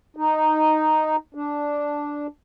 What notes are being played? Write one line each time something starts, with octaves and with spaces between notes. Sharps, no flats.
D#4
D4